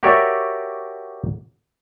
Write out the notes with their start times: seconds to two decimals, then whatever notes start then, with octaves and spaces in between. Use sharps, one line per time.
0.03 F#4 G4 A#4 C#5 D5 E5